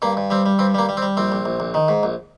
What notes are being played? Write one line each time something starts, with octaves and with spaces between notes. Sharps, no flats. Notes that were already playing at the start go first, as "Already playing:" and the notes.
G2 A#3
G2
G3 C4
G3
G2 C4
G3 A#3
G3
C4
G3
A#1 C4
A#1
A#1
A#1
D#3
G#2
A#1